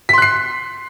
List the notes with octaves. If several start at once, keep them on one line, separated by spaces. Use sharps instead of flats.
C6 F#6 B6 C7